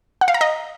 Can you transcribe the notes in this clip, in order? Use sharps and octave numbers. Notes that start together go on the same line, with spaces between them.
F#5
F5
A#5
D#5